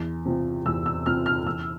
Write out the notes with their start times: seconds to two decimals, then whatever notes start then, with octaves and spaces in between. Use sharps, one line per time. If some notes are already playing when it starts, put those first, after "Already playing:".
Already playing: E2
0.25 C3 F3
0.66 E2 E6
0.86 E6
1.06 C3 F3 F6
1.26 F6
1.46 E2 E6